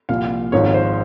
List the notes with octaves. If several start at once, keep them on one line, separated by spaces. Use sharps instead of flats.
C2 A#2 F3 F5
G#1 G#2 F3 C#5
C5